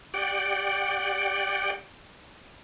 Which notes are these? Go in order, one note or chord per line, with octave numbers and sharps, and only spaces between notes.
G4 D5 F#5 G5